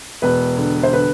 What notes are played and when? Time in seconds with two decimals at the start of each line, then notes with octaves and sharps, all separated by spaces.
0.22 E1 B4
0.58 D3
0.83 C5
0.93 D3 B4